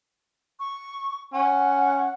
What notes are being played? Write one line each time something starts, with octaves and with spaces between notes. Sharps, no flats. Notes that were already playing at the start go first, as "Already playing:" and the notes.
C#6
C#4 F#5